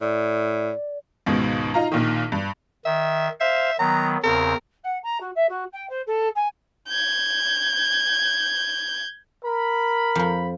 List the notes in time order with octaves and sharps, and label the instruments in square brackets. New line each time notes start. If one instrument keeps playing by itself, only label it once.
[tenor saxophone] A2 [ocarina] D5
[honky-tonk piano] C#2 G#2 B2 D#3
D#4 F4 A#5
A#1 A#2 D#3
G2
[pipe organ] D#3 [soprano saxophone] E5
[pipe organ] C5 F5 [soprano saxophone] E5
[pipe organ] D#3 F#3 B3 [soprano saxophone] A#5
[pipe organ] E2 C#3 C4 [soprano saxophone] A#4
[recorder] F#5
A#5
F#4
E5
F#4
G5
C5
A4
G#5
[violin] G6 G#6
[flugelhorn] A#4 [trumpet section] B5
[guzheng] F2 F3